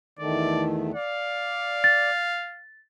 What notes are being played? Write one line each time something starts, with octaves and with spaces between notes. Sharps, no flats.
E2 D#3 A3 D5
D5 F5
A6